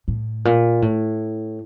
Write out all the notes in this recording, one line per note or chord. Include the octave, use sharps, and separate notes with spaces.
A2
A#2
A2